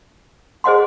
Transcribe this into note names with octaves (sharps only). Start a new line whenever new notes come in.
G#4 C5 D#5 F#5 C6